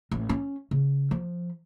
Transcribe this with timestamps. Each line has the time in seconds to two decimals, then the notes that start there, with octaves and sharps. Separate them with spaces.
0.11 A1
0.29 C#4
0.71 C#3
1.11 F3